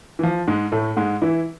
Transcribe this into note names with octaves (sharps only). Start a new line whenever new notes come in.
E3
F3
G#2 G#3
A2 A3
G#2 G#3
E3 E4